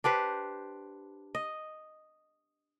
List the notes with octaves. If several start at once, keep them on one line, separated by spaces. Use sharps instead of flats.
D4 G4 B4 C5
D#5